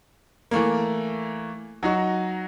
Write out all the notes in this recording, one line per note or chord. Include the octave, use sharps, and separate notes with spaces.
E3 A3 A#3
F#3 D#4 F#4